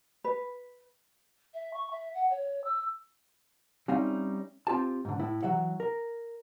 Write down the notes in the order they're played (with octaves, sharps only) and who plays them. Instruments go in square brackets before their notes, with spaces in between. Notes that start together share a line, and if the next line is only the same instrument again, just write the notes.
[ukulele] B4
[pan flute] E5
C#6
E5
F#5
C#5
E6
[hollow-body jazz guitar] G3 C4 C#4 D#4 E5 F5
C4 F4 G4 A5
G#2 D3
A2 E4
E3 F#3 E5 F#5
A#4